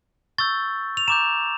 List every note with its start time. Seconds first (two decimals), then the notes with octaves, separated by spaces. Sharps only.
0.38 C#6 E6 G6 A6
0.97 F7
1.08 A#5 D6 G6 E7